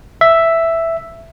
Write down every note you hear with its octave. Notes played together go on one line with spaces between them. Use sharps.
E5